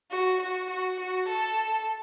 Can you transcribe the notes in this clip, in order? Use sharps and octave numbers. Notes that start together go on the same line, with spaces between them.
F#4
F#4
F#4
F#4
A4